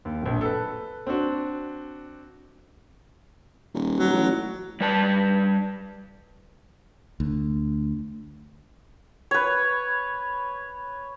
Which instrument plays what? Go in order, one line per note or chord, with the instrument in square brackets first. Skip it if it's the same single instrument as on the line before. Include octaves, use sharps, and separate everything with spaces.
[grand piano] D#2
D1 A#1
A4 B4
C4 D4 F#4
[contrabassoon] D#1
[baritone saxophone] F#3
[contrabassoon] A1
[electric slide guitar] G3 B4 A5
[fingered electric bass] D2
[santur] B4 C#5